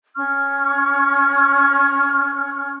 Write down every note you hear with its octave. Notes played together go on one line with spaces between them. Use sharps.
C#4 C#6 F6